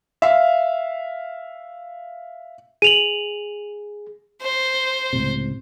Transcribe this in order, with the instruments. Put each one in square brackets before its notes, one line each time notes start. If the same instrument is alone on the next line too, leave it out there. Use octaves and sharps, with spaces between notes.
[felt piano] E5 F5
[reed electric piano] G#4 [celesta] D#7 F7 F#7
[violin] C5
[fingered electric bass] C#2 A2 C3